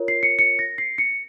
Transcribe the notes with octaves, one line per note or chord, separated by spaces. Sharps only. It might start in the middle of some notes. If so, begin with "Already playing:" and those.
Already playing: F4 A#4 C#5
C7
C#7
C#7
A#6
C7
C#7